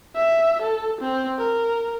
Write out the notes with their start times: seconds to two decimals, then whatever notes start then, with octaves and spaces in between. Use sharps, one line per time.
0.15 E5
0.62 A4
1.01 C4
1.38 A#4